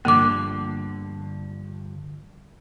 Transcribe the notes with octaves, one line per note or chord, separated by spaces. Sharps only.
G2 D3 F3 A#3 D6